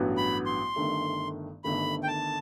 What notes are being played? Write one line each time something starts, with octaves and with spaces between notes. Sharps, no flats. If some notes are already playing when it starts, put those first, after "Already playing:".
Already playing: A1 G2 F#3 B3 F#4
B5
C6
G1 G2 D#3 A3
G1 G2 D#3 A3 B5
G5
A5